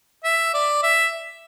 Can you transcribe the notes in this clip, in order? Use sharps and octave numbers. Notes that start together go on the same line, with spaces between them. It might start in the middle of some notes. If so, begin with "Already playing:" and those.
E5
D5
E5